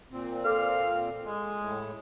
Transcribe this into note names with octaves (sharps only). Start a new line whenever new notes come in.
A#2 C4
A4 F5 D6
G#3
A2